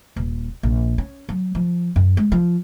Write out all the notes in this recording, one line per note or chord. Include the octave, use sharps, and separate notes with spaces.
D#1
A#1
C#4
F#3
F3
F#2
G#3
F3